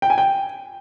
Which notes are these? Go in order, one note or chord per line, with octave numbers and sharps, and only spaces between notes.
G5
G#5
G5